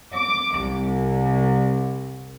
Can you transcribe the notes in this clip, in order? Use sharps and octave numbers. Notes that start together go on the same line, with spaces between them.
D6
C2